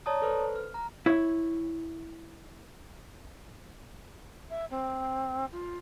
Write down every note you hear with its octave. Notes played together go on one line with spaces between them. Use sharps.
C#5 D5 A5 A#5 D#6
A4 B4 C5
F6
A#5
E4 C#5
E5
C4
F4